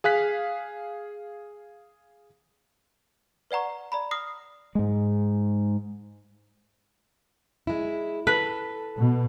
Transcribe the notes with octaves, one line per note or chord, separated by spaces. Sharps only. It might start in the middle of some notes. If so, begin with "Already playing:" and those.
G#4 F5 F#6 B6
B4 D5 F#5 A#5 C#6
D5 A#5 B5
D#6 F6 A#6 C7
G#2 G#3
G#3 E4
A4 B4
B2